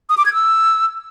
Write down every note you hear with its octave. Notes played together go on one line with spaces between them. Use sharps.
D#6
D6
G#6
E6